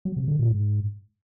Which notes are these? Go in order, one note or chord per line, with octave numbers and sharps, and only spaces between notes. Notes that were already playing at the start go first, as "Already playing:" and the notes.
F#3
C3
D3
A#2
G#2